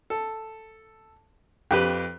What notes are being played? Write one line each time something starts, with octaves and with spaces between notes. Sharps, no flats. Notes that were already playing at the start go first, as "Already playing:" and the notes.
A4
F2 G4 B4